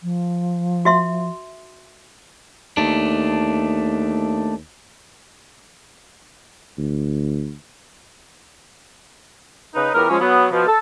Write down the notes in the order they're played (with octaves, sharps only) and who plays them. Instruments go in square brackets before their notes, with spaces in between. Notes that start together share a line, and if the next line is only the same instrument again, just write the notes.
[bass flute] F3
[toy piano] F#4 E5 C6
[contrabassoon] D#2 [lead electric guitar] A3 D4
[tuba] D2
[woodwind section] C#3 D#4 B4
C#2 E3 B3 G4 A#4
F3 G#3 C#4
F#3 B3
B2 F3
A4